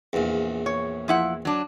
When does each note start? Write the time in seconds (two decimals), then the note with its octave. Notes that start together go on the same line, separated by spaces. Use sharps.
0.13 A#1 E2
0.66 C#5
1.08 F3 E4 F#5
1.45 F#3 D4